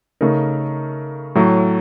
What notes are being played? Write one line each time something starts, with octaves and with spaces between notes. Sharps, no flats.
C#3 A3 D#4 A#4
A2 F#3 A3